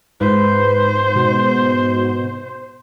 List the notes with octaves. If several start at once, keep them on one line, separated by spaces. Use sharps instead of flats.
G#2 B4 C5
B2